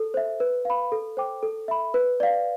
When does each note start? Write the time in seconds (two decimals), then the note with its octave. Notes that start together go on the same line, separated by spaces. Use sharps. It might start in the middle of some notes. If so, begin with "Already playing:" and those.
Already playing: A4
0.14 C5 E5
0.40 B4
0.65 F5 B5
0.92 A4
1.17 C5 G5 D6
1.43 A4
1.68 E5 B5
1.94 B4
2.20 D5 F5